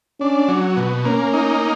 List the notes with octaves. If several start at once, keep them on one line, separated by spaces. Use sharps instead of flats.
C#4 D4
F#3
B2
A#3 C#4
D#4